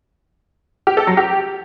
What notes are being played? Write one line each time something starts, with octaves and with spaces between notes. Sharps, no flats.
G4
A4
F#3
G4